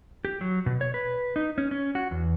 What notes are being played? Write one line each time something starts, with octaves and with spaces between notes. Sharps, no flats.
G4
F#3
B2
C#5
B4
D#4
C#4
C#4
F#4
E2